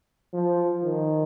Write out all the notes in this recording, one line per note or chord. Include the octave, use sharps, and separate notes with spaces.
F3
D#3